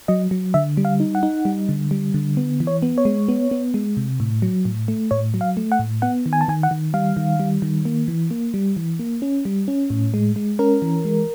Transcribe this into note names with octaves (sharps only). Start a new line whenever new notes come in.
F#3 D#5
F#3
D3 E5
G3
F5
D#4
F#5
D#4
G3
D3
G3
D3
B3
E3
C#5
B3
C#5
G#3
B3
B3
G#3
C3
A2
F#3
A2
A3
A2 C#5
F#3
F5
A3
F#5
A2
B3 F#5
D#3
G#5
A5
D#3 G#5
F#5
D#3
G3 F5
D#3
G3
D#3
A#3
E3
A#3
G3
E3
A#3
C#4
G3
C#4
A2
G#3
G#3
C#4 A#4
E3
G#3